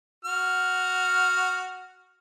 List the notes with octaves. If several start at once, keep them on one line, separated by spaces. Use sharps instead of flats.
F#4 F6